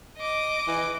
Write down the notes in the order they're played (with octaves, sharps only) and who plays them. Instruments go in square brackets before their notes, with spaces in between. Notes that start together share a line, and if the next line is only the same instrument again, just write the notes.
[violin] D#5 D6
[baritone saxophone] E3